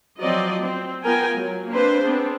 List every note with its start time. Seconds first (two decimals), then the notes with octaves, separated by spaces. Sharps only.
0.20 F3 F#3 C4 D5 D#5
0.60 C4
1.03 B3 F4 A#4 G5 G#5
1.36 F#3
1.68 A#3 C4 D4 B4 C5
2.02 B3 C4 D4 G#4